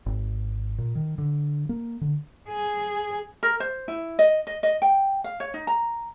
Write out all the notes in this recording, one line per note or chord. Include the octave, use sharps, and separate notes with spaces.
G#1
A#2
D#3
D3
A#3
D3
G#4
A#4
C5
E4
D#5
D#5
D#5
G5
F5
C#5
D#4
A#5